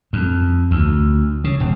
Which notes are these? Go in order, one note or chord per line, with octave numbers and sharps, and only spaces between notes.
F2
D2
C#3
E1